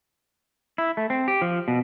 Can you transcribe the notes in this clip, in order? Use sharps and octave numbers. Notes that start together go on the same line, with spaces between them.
E4
A3
C4
G4
F3
B2